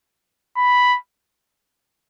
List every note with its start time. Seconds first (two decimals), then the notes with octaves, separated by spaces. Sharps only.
0.57 B5